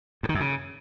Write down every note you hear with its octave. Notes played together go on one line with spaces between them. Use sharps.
G2
D#3
F#2
C#3